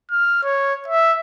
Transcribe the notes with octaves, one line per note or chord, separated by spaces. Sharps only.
F6
C#5
E5